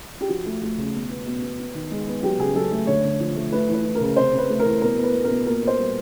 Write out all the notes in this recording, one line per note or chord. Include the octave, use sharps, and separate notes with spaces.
G4
F3 F#4
A3
A3
C#3
B2
B3
B2
B3
B3
D#3
G#3
B3
F#3 G4
C#3 G#4
F#3 A4
A3
D3 C#5
D3
F3
A3
A3 B4
E3
B4
E3
C#3 A#4
C3 C5
C3
B4
A3
A#4
E3
B2 A#4
B3
B4
B2
B2 A#4
A#2 A#4
B3
C5
G3